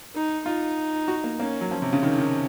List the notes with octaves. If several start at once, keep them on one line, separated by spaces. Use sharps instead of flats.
D#4
D#4 F4
F#4
A#3
A#3 C#4
F#3
F3 C#4
C3
C#3
D#3
D#3